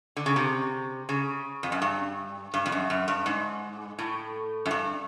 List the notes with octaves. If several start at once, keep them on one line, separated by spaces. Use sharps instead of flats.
D3
C#3
C3
C#3
F2
F#2
G2
G2
F2
F#2
F#2
G2
G#2
A2
F#2
G2